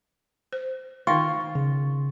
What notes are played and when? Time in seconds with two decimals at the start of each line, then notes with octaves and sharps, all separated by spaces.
0.53 C5
1.07 D#3 D#4 F4 G5 C#6
1.55 C#3